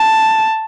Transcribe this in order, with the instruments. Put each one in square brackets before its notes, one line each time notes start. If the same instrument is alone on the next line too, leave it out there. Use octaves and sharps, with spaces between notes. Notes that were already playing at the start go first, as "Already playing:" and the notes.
Already playing: [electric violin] A5